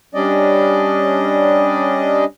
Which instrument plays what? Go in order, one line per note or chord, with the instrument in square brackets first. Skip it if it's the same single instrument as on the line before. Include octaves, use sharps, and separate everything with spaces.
[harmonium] G3 C#4 D4 D5 D#5